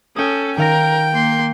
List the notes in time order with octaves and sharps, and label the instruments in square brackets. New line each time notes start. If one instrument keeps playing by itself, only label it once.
[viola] C#4 A4 [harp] G5 D#6
[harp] D#3 F5 A#6 [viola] A#4 [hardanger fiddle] G5
[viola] A#3 C6